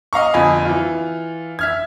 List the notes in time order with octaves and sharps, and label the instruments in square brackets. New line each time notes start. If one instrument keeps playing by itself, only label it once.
[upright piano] D#5 F5 A#5 C#6
G1 F2 D#5 G#5 B5
E3 F4
E5 F6 G#6